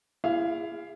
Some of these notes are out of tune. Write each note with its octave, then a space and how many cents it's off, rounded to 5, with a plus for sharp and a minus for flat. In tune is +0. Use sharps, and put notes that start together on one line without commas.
E4 +30 G#4 -30 F5 +0